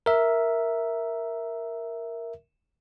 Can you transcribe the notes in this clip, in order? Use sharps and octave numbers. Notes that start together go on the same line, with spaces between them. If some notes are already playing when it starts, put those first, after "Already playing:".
A#4 E5